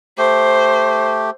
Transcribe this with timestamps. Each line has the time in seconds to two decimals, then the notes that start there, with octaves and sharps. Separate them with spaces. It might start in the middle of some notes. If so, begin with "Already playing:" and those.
0.18 A3 G4 C5